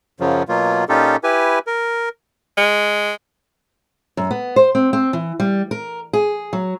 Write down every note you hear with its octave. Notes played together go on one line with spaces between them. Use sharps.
F#2 C#3 F3 F#3
B2 F#3 A#3 F4
A#2 C#4 D#4 F4 G4 A4
E4 G4 B4 G#5
A#4
G#3
F#2
B3
C5
C4
C4
E3
G3
A#4
G#4
F#3